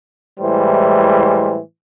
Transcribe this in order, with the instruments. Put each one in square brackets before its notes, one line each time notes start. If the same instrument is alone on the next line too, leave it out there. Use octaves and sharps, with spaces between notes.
[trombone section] A2 E3 G3 G#3 C5